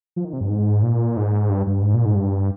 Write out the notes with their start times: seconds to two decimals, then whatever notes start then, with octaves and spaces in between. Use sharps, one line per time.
0.16 F3
0.25 D#3
0.33 C3
0.41 G2
0.50 G#2
0.83 A#2
1.17 G#2
1.49 G2
1.67 G2
1.82 G#2
1.94 A#2
2.05 G#2
2.15 G2